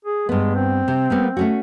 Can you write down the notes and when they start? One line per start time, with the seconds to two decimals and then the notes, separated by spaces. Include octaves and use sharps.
0.05 G#4
0.29 G2 G#3 B3
0.55 C4
0.88 C3
1.10 G3 A#3 B3
1.37 A3 C#4 F#4